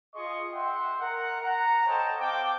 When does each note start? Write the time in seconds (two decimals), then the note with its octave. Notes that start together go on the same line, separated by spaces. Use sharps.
0.14 F4 G#4 D#5 C6 C#6
0.53 E5 F#5 G5 C6
1.00 A#4 F#5
1.41 F#5 A#5
1.87 A4 C5 C#5 D#5 G5 A5
2.19 C4 F5 G5 A5 D6